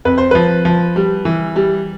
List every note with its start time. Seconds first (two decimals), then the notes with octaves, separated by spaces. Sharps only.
0.05 F2 B4
0.18 C5
0.31 F3 B4
0.65 F3
0.96 G3
1.25 E3
1.56 G3